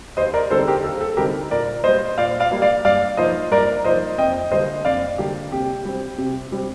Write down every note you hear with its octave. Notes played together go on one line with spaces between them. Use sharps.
D#2 C5 D#5
A#4 D5
D3 G3 C4 D#4 A4 C5
G4 A#4
D#2 A4
A4
D3 G3 C4 D#4 G4 A#4
A#2 A#4 D5
G3 A#3 C5 D#5
A#2 D5 F5
D5 F5
G3 A#3
D5 F5
G2 D5 F5
F3 A#3 D#4 C5 D#5
G2 A#4 D5
F3 A#3 D#4 C5 D#5
F2 D#5 G5
D3 G3 A#3 C5 D#5
F2 D5 F5
D3 G3 A#3 G4
C3 G4
G3 C4
C3
G3 C4